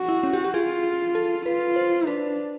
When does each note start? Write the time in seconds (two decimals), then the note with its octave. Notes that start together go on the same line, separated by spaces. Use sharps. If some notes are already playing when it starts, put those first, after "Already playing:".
Already playing: F#4
0.09 E4
0.23 C#4
0.33 G4
0.44 G4
0.54 F4 G#4
1.15 A4
1.46 F4 B4
1.76 C5
2.07 D4 B4